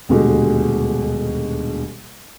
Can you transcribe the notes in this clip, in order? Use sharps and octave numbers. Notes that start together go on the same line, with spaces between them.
D#1 D2 B2 G#3 F#4 G4